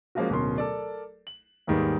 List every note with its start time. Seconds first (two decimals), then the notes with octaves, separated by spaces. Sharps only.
0.15 F3 G#3 A#3 C#4 F4 F#4
0.30 D1 B2 C#4 A#4 C6
0.58 A4 A#4 D5
1.27 F#7
1.67 D#2 G#2 D#3 G3 G#3 B3